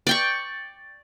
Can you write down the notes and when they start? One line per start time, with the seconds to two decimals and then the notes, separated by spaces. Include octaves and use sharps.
0.07 D5 G5 C#6